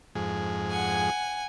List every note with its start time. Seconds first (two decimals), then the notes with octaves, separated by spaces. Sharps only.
0.15 F2 G#2 G#4
0.71 F#5 G#5